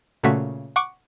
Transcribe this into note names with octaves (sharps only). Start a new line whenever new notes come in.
A#2 C#3 A3 F#4 B6
F#5 C#6 D6